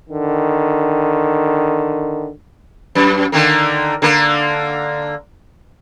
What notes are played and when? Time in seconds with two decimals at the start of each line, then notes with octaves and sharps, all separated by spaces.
0.10 D3 D#3
2.95 F#2
3.32 D3 D#3 A#3
4.02 D3 A#3